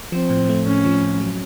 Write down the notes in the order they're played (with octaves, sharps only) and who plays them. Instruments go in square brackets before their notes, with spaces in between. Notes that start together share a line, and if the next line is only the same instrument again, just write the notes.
[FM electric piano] F3 [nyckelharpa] C4
[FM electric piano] A2
A3
[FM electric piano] A2 [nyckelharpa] C#4
[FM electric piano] F3
A2
F#3